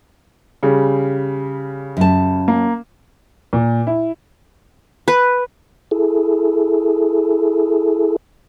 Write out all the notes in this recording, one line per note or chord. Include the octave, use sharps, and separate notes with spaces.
C#3 G3
F#2 A5
A#3
A#2
E4
B4
E4 G#4 A4